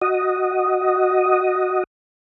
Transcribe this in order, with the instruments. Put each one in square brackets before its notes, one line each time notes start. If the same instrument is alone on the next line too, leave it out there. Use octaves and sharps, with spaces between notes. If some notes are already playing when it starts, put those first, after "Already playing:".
[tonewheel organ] F#4 D#5